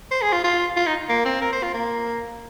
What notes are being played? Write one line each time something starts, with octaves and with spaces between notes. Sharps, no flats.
C5
G#4
F4
F4
F4
D#4
A#3
C4
A#4
C5
F4
A#3